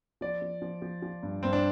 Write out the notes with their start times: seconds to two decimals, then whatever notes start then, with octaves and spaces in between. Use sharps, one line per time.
0.21 F3 D5
0.42 F3
0.62 F3
0.82 F3
1.03 F3
1.23 G2
1.43 G2 C4
1.53 D4